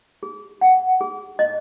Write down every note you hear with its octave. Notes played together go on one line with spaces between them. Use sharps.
G#4
F#5
G#4
D#5